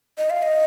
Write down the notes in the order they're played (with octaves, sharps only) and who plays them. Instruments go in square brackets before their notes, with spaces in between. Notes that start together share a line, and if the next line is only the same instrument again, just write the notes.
[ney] D#5
F5
D#5